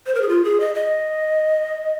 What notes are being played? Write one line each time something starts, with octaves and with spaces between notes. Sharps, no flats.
C5
A#4
G#4
F4
G#4
D#5
D#5